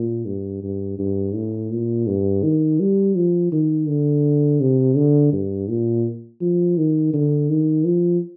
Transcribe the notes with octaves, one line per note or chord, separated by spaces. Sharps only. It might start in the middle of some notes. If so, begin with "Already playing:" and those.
Already playing: A#2
G2
G2
G2
A2
A#2
G2
D#3
G3
F3
D#3
D3
C3
D3
G2
A#2
F3
D#3
D3
D#3
F3